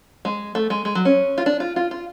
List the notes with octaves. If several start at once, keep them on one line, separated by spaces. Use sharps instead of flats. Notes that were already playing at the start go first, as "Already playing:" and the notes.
G#3
A3
G#3
G#3
F#3
C#4
F4
D4
F4
F4
F4